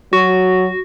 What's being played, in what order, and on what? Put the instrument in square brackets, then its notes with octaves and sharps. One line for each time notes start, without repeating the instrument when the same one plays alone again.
[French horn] F#3 [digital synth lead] F#4